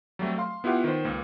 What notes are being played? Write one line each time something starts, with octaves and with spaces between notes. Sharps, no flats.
F#3 G3 A3 C4
F5 C6
B3 E4 F4 G4 F#5
D#3 B4 C5
C#2 A#3